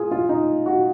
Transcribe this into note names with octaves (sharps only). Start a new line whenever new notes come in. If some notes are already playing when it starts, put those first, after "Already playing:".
Already playing: F4 G#4
F4
D#4
F#4